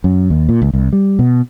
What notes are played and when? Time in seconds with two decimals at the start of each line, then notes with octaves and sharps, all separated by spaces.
0.04 F#2
0.30 D#2
0.49 A#2
0.62 C#2
0.73 C2
0.93 G3
1.19 B2